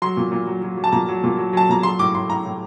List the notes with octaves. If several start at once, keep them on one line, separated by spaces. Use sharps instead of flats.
F#3 C6
A#2
A#2
F#3
F#3
F#3
A5
A#2 A#5
F#3
A#2
F#3
F#3 A5
A#2 A#5
F#3 C6
A2 D6
A2 C6
A2 A#5
A2